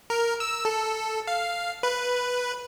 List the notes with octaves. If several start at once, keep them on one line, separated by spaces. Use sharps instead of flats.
A#4
E6
A4
F5
B4